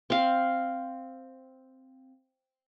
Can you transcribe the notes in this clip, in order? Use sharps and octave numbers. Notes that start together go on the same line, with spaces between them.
C4 F5